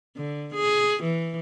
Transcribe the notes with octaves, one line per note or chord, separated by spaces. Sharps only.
D3
G#4
E3